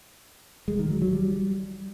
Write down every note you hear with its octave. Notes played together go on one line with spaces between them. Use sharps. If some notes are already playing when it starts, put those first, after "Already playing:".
G#3
D#3
F#3
F#3
G3